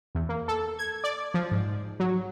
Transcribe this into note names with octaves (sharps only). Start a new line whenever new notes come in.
E2
A#3
A4
G#6
D5
F3
G#2
F#3